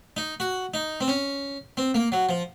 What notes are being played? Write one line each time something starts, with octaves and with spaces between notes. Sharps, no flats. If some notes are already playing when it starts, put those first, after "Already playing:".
D#4
F#4
D#4
C4
C#4
C4
A#3
F#3
F3